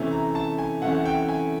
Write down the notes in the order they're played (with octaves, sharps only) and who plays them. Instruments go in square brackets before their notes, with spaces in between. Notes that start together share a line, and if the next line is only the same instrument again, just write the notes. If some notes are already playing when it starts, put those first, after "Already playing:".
Already playing: [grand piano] C3 E3 A3 C#4
A#5
A5
G#5
C3 E3 A3 C#4 F#5
F#5
G5
G#5